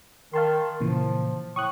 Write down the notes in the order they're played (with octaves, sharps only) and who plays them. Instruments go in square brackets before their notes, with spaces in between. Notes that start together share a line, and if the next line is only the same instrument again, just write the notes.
[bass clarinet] D#3 [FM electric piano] F5 A5 C6
[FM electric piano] A#2 C#3 E3 [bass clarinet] F3
[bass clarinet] A2 [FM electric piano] C#6 D#6 F#6